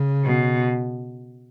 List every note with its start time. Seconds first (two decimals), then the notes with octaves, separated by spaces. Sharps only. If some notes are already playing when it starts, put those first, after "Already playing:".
Already playing: C#3
0.24 B2